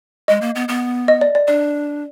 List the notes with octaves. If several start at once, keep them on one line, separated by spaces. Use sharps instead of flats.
G#3 D#5
A#3
B3
B3
D#5
D5
D5
D4 D5